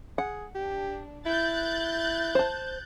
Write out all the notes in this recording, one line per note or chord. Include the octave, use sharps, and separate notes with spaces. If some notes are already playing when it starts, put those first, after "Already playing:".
G#4 F#5
D4 G4
E4 F#6 G6 A6
C5 A5